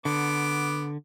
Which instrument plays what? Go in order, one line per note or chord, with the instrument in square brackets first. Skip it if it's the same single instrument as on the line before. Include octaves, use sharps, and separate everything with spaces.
[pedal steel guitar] D3 [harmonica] B3 D6